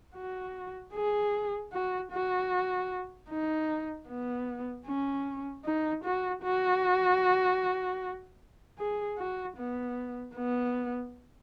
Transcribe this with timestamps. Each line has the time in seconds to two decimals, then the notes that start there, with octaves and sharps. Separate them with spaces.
0.16 F#4
0.94 G#4
1.73 F#4
2.12 F#4
3.30 D#4
4.08 B3
4.86 C#4
5.65 D#4
6.04 F#4
6.43 F#4
8.79 G#4
9.18 F#4
9.57 B3
10.35 B3